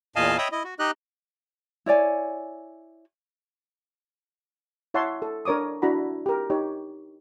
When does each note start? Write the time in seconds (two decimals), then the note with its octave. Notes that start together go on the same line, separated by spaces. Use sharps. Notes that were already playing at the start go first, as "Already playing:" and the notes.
0.16 E2 A#2 D#5 F5 G#5 A5
0.38 C#5 D#5 E5 G5 B5 D#6
0.52 E4 D#5
0.64 F#4
0.79 D#4 G4 D#5 F#6
1.86 E4 C#5 D5 G#5
4.94 E4 C#5 E5 F#5 A5 C6
5.22 A4
5.45 D4 A#4 C#5 D6 D#6
5.82 D4 E4 F#4 F#5 A#5 B5
6.26 G4 A#4
6.50 D#4 G4 C#5